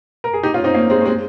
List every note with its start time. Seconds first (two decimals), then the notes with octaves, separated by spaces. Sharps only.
0.24 A#4
0.33 G#4
0.43 D#4 G4
0.54 C#4 F4
0.64 C4 D#4
0.74 A#3 C#4
0.90 G#3 C4
1.01 C#4
1.05 G#3 C4